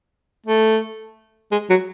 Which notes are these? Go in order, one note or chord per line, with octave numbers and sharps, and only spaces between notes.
A3
G#3
F#3